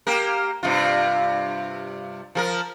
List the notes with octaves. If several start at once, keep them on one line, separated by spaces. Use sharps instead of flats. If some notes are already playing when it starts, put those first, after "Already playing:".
A#3 G4 A#4
G2 C3 F4
F3 A4 A#4